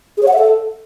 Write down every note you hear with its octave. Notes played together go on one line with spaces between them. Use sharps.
G#4
C#5
F#5
E5
A4